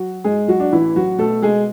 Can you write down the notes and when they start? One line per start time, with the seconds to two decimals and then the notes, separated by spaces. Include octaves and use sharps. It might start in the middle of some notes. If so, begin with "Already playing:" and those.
Already playing: F#3 F#4
0.24 G#2 G#3 G#4
0.48 F#3 F#4
0.60 D4
0.73 A1 E3 E4
0.96 F#3 F#4
1.18 B2 A3 A4
1.42 G#3 G#4